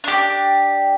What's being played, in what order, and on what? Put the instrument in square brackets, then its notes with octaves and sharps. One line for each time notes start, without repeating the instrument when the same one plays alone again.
[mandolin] D4 G4